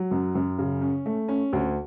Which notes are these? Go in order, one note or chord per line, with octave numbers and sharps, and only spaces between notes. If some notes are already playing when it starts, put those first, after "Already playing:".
Already playing: F#3
F#2
F#2
C#3
C#4
A3
C#4
D2